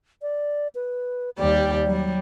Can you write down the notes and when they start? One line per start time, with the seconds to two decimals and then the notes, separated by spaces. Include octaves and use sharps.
0.22 D5
0.75 B4
1.37 D#2 G3 G4 D5
1.86 F#3 G3